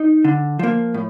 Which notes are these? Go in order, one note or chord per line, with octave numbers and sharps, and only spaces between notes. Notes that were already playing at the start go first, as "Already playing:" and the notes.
Already playing: D#4
D3
F3 A#3
A2